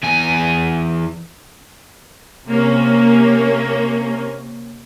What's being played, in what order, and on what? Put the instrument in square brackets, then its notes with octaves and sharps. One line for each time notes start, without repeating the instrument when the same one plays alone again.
[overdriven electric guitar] E2 G#5
[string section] C3 A#3 C#4